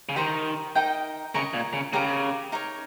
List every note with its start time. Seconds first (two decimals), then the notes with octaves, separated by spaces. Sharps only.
0.09 C#3
0.16 D#3 G4 C5 G5 A#5
0.75 D#4 A#4 D#5 G5
1.34 C#3 A#4 D#5 A#5 C#6
1.54 A#2
1.73 C#3
1.93 C#3 G4 A#4 F5 A#5
2.52 D#4 A#4 C#5